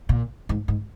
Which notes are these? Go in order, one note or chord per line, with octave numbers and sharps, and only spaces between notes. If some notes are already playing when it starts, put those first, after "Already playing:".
A#2
G#2
G#2